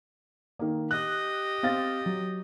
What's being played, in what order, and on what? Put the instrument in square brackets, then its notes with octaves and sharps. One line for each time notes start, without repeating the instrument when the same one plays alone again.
[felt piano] D#3 A#3
[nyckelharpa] G4 D#5 [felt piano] F#6
[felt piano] C4 F5 A6
F#3